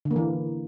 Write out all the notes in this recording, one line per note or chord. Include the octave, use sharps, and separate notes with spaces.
D3
A#3
E3